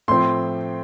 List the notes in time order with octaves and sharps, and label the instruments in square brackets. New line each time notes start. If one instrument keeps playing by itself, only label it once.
[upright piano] A2 F3 C4 C6